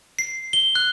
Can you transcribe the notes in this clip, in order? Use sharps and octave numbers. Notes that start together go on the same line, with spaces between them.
C7
G7
F#6